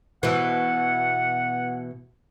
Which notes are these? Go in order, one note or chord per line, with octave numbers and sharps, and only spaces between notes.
B2 E3 F#5